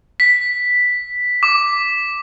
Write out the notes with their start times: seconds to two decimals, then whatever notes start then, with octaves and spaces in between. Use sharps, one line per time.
0.20 B6
1.43 D6